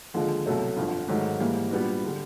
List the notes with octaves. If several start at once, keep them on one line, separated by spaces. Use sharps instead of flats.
D#2 D3 F3 G#3
C2 B2 F#3 A3
G1 F2 D3
G#2 D#3 F#3 A3
G#2 E3 G3 A#3
A#2 G3 B3 D4 F#4
D3 G3